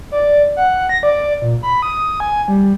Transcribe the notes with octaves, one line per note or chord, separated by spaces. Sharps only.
D5
F#5
A#6
D5
A#2
B5
D#6
G#5
G3